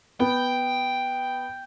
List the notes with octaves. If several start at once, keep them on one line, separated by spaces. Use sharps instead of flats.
B3 G5